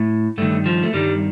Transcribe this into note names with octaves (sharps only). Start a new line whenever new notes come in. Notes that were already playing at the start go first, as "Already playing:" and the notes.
Already playing: A2
G2 D#3 A3
F3
A3
G2 D#3 G3